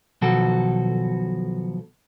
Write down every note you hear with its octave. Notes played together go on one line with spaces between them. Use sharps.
B1 B2 D#3 F3 F#4 A4